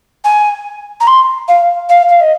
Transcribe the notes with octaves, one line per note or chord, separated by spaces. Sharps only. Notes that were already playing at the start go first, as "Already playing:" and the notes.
G#5
A#5
C6
F5
F5
F5
D#5